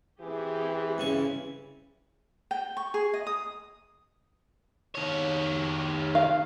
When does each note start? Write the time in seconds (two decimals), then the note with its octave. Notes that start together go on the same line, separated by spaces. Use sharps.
0.21 E3 C4 G4 G#4
0.98 G2 C#3 C4 C#4 E4 C#6
2.51 G5
2.77 C#6
2.94 G#4
3.13 D#5
3.27 D#6
4.95 D#3 C#5
6.15 F5